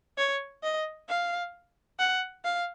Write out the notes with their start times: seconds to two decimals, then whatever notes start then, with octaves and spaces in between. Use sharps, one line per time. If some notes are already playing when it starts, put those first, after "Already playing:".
0.18 C#5
0.63 D#5
1.08 F5
1.99 F#5
2.44 F5